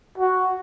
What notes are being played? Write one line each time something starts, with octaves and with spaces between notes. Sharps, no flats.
F#4